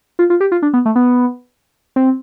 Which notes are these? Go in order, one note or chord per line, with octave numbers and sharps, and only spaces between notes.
F4
F4
G4
F4
D4
B3
A3
B3
C4